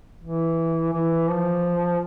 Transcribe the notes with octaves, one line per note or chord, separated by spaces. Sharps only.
E3
E3
F3